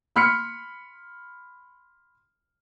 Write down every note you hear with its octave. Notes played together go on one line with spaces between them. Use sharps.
B5 C6 F6 B6 C#7